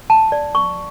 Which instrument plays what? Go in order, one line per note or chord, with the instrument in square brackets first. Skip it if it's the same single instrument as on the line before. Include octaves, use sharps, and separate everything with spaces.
[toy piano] A5
D5
C#6